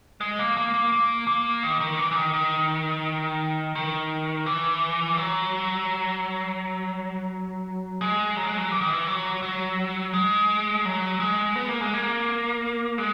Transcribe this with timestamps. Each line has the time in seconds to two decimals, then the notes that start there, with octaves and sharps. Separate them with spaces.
0.21 G#3
0.39 A#3
0.57 A#3
0.74 A#3
0.92 A#3
1.27 A#3
1.63 D#3
1.80 D#3
1.99 E3
2.11 E3
2.16 D#3
2.33 D#3
3.75 D#3
4.46 E3
5.17 F#3
8.01 G#3
8.36 F#3
8.47 G#3
8.58 F#3
8.72 E3
8.81 D#3
8.90 E3
9.07 F#3
9.43 F#3
10.13 G#3
10.85 F#3
11.20 G#3
11.56 B3
11.69 A#3
11.81 G#3
11.94 A#3
12.98 G#3